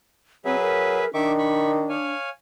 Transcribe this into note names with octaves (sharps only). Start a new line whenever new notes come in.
F#3 C4 G#4 B4 E5
A#4
D#3 D4 E5 C#6 D6
B5 C#6
C#5 F5 G#5